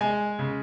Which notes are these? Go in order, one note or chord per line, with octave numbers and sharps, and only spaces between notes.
G#3 G#5
C#3